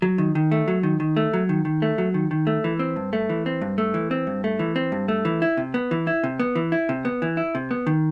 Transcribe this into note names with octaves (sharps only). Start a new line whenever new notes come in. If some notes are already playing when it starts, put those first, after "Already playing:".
F#3
D#3
D#3
A3
F#3
D#3
D#3
A3
F#3
D#3
D#3
A3
F#3
D#3
D#3
A3
E3
C4
G2
A3
E3
C4
G2
A3
E3
C4
G2
A3
E3
C4
G2
A3
E3
E4
C3
B3
E3
E4
C3
B3
E3
E4
C3
B3
E3
E4
C3
B3
D#3